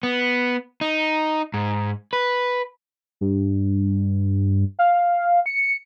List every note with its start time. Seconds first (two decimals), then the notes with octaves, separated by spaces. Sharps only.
0.03 B3
0.81 D#4
1.54 G#2
2.13 B4
3.21 G2
4.79 F5
5.46 C#7